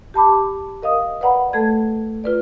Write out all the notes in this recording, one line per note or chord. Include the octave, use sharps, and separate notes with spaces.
G4 A5 B5 D6
A#4 D#5 F5 D#6
B4 D5 F#5 A#5 B5
A3 A4 G#6
F4 B4 D5